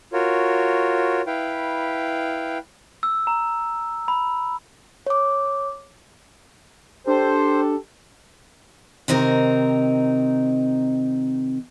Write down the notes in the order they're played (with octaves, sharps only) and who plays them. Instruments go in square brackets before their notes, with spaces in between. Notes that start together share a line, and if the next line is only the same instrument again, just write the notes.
[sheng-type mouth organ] F4 F#4 A#4 C#5
E4 B4 F5 G5
[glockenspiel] E6
A#5
B5
[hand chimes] C#5 D6
[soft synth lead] D4 [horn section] G4 A4 [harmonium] C5
[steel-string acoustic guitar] C3 D#3 C4 D#4 A#4